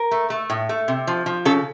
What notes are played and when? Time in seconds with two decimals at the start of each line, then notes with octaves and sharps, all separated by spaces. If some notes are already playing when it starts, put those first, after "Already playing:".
Already playing: A#4
0.11 A3
0.30 A3
0.50 A2
0.69 A3
0.88 C3
1.07 F3
1.26 F3
1.45 C#3 A4